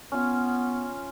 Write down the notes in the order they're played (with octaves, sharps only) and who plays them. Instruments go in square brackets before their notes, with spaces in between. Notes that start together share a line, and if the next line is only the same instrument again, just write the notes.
[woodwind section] B3 [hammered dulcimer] C#4 F4